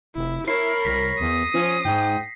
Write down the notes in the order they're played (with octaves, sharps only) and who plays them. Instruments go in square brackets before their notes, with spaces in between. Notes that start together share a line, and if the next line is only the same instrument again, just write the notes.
[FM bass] F1 [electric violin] E4
[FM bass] E4 [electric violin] A#4 B5 [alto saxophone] C#5 [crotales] C7
[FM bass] C2 [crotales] A#6 B6
[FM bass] E2 [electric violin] D#6
[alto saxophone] F3 [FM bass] C#4
[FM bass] G#2 [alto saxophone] G5